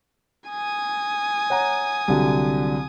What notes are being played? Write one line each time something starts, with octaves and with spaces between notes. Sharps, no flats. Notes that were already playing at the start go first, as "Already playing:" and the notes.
G#5 D#6
C#5 F#5 A#5
C2 D3 F#3